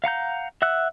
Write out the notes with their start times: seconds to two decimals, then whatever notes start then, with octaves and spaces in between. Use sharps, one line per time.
0.04 F5 F#5 A#5 G6
0.62 E5 F#5 E6 F#6